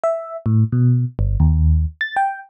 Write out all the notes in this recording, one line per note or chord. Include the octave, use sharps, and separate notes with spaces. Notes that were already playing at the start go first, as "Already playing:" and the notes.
E5
A2
B2
G1
D#2
A6
G5